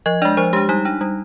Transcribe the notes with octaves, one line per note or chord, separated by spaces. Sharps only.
F3 D#5
G#3 D4 D5
F3 C5
G#3 D4 G4
G3 D#4
D4
G3